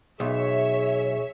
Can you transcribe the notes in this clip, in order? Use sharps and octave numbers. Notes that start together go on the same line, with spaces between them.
B1 G#4 C#5 E5